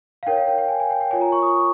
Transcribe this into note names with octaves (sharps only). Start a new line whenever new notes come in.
F5
D#4 A#4 C#5 G5
F5
G5
G5
G#5
G#5
G5
G5
F4 A#4 C#5 G#5
A#5
C#6
D#6
D#6